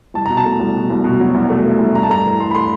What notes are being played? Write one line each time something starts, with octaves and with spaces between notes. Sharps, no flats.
C2 A5
B2 A#5
A5
A3
C2
B2
C2
B2
F#3
C2
A3
A3
C2
G2 A#5
A5
A3 A#5
E3
A3 C6
B5
A3 C6